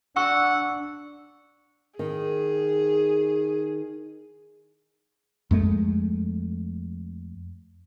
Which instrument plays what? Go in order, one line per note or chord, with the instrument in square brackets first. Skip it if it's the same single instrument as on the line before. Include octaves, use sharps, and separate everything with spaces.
[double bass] D4 [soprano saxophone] F#5 [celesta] C#6 [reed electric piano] E6
[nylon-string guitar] D#3 [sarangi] G#4
[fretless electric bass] F2 G#3 A3